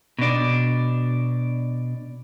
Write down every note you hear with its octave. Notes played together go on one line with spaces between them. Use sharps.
B2 D4